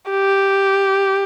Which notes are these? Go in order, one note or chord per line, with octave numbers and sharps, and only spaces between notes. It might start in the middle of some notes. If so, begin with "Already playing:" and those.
G4